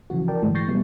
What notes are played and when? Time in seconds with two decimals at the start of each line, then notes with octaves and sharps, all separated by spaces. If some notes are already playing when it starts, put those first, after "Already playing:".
0.10 C#3 E3 F3 F#4
0.28 A#4 D5 G5 A5
0.42 G#2 D3 E3 G#3 A3
0.55 C#6 G6 A6 A#6 C7
0.68 B2 F#3 G3 A3 B3